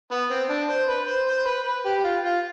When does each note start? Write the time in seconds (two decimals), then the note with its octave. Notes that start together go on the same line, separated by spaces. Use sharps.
0.11 B3
0.31 C4
0.49 D4
0.69 C5
0.88 B4
1.07 C5
1.27 C5
1.46 B4
1.66 B4
1.85 G4
2.04 F4
2.24 F4